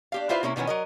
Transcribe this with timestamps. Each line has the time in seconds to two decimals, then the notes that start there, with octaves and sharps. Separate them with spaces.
0.12 D4 G4 F5
0.29 E4 F4 B4 C5 E5 F5
0.43 C3 A#3 C#4 E4
0.56 B2 D#3 E3 B3 C#4
0.67 F#3 A#4 D#5